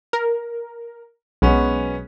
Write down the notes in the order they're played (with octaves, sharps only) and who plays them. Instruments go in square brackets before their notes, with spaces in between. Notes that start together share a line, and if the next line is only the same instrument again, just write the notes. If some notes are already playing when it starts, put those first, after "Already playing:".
[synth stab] A#4
[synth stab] B1 [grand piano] G#3 B3 C#4